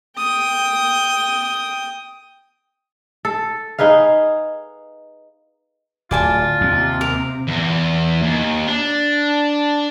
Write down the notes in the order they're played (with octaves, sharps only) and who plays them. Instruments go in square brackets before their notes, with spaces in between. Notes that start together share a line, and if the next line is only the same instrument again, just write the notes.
[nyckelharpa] G5 D#6
[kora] A4
D#4 G#4 B4 F5
[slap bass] D1 [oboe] F4 [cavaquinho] D5 G#5 A5
[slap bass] D#2 [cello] C3
[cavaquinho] A#4
[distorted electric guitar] E2
D#2
D4